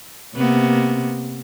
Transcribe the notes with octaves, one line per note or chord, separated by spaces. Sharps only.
C3 A#3 B3